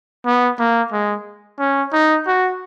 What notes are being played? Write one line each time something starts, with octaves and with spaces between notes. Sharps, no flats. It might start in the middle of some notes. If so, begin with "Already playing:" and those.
B3
A#3
G#3
C#4
D#4
F#4